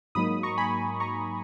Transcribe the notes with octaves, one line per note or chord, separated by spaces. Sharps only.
G#2 F#3 A#3 D#4 B5 D#6
A#5 C#6
G#5 B5
A#5 C#6